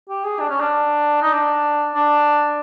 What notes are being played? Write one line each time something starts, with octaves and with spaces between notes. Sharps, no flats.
G4
G#4
D4
C#4
D4
D#4
D4
D4